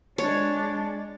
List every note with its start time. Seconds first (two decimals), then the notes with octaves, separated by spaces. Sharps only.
0.18 G#3 D4 C#5